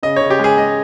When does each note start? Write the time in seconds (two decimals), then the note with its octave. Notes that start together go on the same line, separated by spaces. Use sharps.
0.03 C#3 D#5
0.16 C#3 C#5
0.30 G4
0.39 G#3 G#4
0.57 G#3 D#5